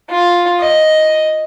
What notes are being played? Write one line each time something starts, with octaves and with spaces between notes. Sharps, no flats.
F4
D#5